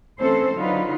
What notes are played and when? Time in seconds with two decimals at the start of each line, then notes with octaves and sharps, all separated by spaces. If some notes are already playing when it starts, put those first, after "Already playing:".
0.19 E3 A3 C4 C#4 A4 C5
0.55 D3 F#3 D#4 F4 B4